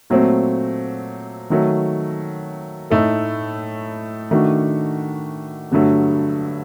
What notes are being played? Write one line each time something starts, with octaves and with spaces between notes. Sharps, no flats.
A#2 F#3 A3 C4
D#3 F#3 A3
A2 A3 D#4 A4
D#3 A3 D4 F#4
G2 D3 F#3 A3